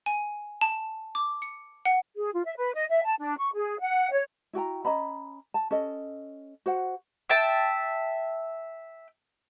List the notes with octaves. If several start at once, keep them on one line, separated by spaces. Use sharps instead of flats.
G#5
A5
D6
C#7
F#5
G#4
F4
E5
B4
D#5
E5
A5
D4
C#6
G#4
F#5
C#5
E4 F#4 G5 A#5
C#4 D#5 A#5 B5
A5
C#4 A4 D#5
F#4 C5 F#5
E5 G5 A5